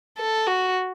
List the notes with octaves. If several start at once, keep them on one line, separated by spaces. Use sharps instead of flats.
A4
F#4